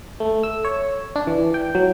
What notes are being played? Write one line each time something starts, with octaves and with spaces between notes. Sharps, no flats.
A3
E6
C#5
D4
E3
G5
F#3